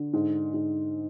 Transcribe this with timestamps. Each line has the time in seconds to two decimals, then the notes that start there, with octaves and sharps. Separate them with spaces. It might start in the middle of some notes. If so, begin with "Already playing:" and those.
Already playing: D3
0.13 G#2
0.54 G#2